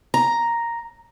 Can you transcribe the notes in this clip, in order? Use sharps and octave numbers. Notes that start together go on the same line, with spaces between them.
A#5